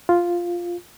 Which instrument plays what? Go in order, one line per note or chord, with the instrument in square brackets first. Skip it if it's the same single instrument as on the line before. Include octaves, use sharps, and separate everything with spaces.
[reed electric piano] F4